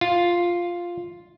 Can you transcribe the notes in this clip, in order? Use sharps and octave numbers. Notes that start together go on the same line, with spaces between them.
F4